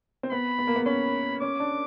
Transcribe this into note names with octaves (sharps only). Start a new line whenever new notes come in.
C4
B3 B5
B3
A#3
B3
C#4 B5
C#4 D6
D4